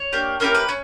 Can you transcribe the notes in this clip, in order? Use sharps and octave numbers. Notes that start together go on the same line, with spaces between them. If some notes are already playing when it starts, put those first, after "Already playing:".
Already playing: C#5
A#3 D4 G4
A#3 C#4 E4 G4 A#4
B4
C#4